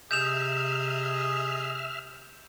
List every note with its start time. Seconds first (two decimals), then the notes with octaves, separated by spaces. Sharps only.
0.11 C3 G#4 D#5 E5 F6 G6 E7 F7